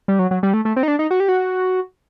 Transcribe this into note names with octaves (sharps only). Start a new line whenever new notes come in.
G3
F#3
F#3
G3
A3
A3
C4
D#4
D4
D#4
F#4
G4
F#4